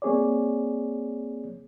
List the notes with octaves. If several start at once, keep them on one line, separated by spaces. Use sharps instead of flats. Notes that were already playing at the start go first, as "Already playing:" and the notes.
A#3 C4 G#4 C#5 D5